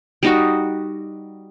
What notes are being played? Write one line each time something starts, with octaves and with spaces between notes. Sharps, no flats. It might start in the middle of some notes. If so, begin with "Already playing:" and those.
G3 D#4 F#4